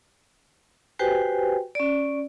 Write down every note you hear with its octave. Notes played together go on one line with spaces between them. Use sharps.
F#4 G4 B4 C5 G5 G#5
C#4 D5